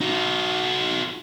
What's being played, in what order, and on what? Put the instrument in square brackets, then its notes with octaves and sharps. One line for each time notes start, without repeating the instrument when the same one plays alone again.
[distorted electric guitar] D#4 F#4